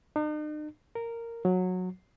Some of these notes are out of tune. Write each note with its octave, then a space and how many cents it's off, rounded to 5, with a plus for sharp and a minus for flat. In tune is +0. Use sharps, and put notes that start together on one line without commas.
D#4 -45
A#4 -10
F#3 -15